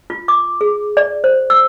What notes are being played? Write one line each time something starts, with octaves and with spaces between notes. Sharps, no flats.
F4
D6
G#4
D5
C5
E6